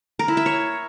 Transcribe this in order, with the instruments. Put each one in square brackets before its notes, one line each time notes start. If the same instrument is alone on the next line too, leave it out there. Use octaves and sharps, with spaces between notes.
[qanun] A#4
E4
E5
C#5